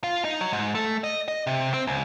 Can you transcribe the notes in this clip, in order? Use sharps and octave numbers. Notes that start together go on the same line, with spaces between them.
F4
D#4
F#3
G#2
A3
D#5
D#5
C3
C4
C#2